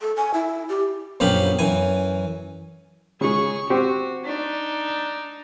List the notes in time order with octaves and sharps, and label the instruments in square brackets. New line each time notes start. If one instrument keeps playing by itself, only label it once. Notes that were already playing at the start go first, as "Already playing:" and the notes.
[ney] A4
G#5
E4
G4
[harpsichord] A#1 F#2 B3 G4 F5 B5
F#2 E3 G#5
[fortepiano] C#3 G#3 [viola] G#4 C#6
[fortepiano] C4 G4 [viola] F#4
[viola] D4 D#4